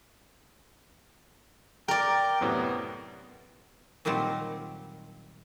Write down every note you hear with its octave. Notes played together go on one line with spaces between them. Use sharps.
A#4 D5 G5
F#2 A2 C3 B3
A#2 D#3 F#3 G3 C4